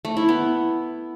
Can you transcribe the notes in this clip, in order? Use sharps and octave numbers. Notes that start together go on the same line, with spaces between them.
A3
E4
B3